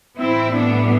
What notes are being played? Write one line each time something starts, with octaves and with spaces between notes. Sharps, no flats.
A2 E3 G3 C4 E4
B3 D4